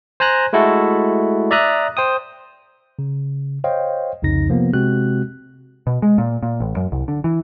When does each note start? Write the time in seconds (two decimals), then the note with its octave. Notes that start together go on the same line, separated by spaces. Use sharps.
0.20 C5 G#5 A#5 F#6 A#6
0.53 G#3 A3 E4 F#4 A4
1.51 D5 E5 A#5 D#6 F#6
1.97 C5 G5 D#6
2.99 C#3
3.64 C5 C#5 D#5 F5 G5
4.22 C2 F2 C#3 D#4 A#6
4.48 C3 F3 A#3 B3
4.73 C3 G#3 C4 F#4 F#6
5.87 B2
6.02 G#3
6.18 A#2
6.43 A#2
6.60 A1
6.77 F#2
6.92 C2
7.08 D3
7.24 E3